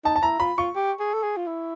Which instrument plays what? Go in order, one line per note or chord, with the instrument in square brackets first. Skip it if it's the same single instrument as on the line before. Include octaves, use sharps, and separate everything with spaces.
[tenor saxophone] D#4 [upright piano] A5
[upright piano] A5
[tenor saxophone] E4 [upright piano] A#5
[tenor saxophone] F4 [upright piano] B5
[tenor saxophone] F4 [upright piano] C#6
[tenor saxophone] G4
G#4
A4
G#4
F4
E4